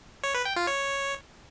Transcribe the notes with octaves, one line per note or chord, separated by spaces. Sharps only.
C#5
B4
G5
F4
C#5